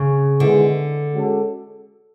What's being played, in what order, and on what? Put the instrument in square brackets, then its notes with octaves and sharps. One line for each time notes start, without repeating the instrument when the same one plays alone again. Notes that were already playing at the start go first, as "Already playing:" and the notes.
Already playing: [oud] C#3
[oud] D3 [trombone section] D#3 G#3 B3 E4 G#4
[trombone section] G#3 C#4 F#4 A4